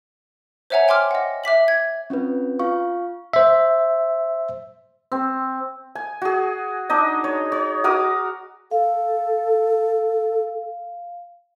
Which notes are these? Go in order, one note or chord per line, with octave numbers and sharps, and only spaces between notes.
C5 C#5 E5 F#5 G#5 A#5
G5 G#5 C6 D6 F6
D#5 F#5
E5 D6 B6 F#7
G#6
C4 C#4 F4 B4
F4 F5 C#6
C5 E5
C4
G#5
F#4 G#4
D4 D#4 D#5
C#5
C#5
F#4 A#4 D6 D#6
A4 F5